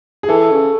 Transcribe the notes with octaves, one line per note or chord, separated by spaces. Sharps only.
G#4
E3 A4
C#3